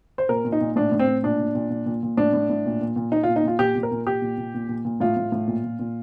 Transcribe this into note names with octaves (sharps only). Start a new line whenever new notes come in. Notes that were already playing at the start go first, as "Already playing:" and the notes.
C5
A#2 A#4
A#2
D#4
A#2
A2 D4
A2
C4
A2
A#2 D4
A#2
A#2
A#2
A#2
A#2
A2 D4
A2
A2
A#2
A#2
A#2
A#2 D#4
F4
A#2
D#4
A#2 F4
A#2 G4
A#2
A#4
A#2
A#2 G4
A#2
A#2
A#2
A#2
A#2
A2 F4
A2
A2
A#2
A#2
A#2